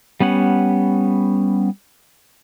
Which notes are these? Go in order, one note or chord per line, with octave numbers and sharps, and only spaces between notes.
G3 B3 C#4 F#5